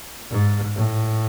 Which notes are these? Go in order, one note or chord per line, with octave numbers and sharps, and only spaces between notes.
G#2
A2